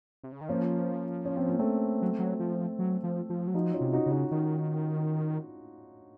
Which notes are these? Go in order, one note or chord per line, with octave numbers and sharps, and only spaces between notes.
C3
C#3
D#3
F3 A#3 C#4
C#4
C4
A#3
A3 C4
F#3
F#3
F3
F#3
F3
F3
F#3
F3 D#4 F#4
C#4 F4
C3
D#4 F#4
C#3
D#4 F#4
D#3